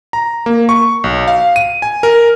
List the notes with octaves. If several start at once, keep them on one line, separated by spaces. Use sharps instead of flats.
A#5
A#3
C#6
B1
F5
D#7
G#5
A#4